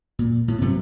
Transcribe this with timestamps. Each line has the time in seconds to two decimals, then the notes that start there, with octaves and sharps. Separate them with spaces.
0.19 A#2
0.48 A2
0.61 G2 C3 F#3 A3